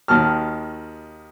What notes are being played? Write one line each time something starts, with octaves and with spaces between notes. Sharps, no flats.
D#2 D#3 F#4 A5 F6